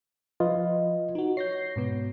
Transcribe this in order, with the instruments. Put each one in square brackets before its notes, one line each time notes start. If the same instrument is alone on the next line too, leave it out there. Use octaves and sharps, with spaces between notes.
[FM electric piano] F3 [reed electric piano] F4 B4 D#5
[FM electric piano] D#4 F#4
[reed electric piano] C#5 [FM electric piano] G6 A#6 C7
[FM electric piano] G#2 B2 B3